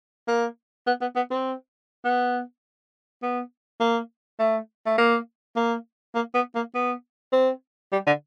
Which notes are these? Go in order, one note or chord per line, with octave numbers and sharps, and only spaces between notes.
A#3
B3
B3
B3
C4
B3
B3
A#3
A3
A3
A#3
A#3
A#3
B3
A#3
B3
C4
G3
D3